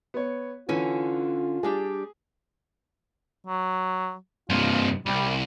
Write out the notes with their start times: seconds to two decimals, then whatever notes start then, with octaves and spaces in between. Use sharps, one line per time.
0.14 B3 C#5
0.69 D3 E3 C#4 F4 G#5
1.63 G3 D4 G4 G#4
3.46 F#3
4.50 G2 C3 F4
5.06 C2 G3